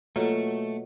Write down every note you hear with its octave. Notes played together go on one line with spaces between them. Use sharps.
B2 F#3 A3 A#3 F4 A4